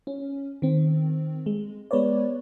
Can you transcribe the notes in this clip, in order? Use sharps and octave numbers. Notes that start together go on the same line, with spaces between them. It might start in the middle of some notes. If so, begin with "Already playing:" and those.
C#4
D#3 C4
G#3
G#3 B3 B4 C#5 D5